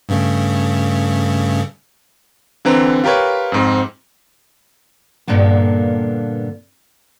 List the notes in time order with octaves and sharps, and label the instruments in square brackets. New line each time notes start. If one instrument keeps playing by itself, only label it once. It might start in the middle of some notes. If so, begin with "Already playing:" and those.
[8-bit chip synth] G2 C#3 A3
[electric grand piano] D3 E3 C4 A#5
F4 G4 A#4 B4 C#5
F2 G#2 C4
[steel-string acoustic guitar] G2 A#2 D3 A#3 B3